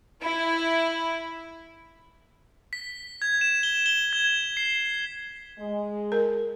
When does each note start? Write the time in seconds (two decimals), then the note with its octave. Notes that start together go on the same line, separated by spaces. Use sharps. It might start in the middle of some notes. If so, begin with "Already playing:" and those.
0.22 E4
2.73 B6
3.22 G#6
3.41 E7
3.63 G7
3.86 G7
4.13 G#6
4.57 C7
5.58 G#3
6.12 A#4